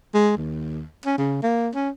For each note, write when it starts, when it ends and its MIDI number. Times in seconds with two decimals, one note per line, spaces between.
0.14 0.32 56
0.37 0.85 39
1.06 1.18 61
1.18 1.41 49
1.43 1.69 58
1.75 1.89 61